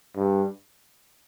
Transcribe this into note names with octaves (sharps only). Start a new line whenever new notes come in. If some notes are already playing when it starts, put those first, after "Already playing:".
G2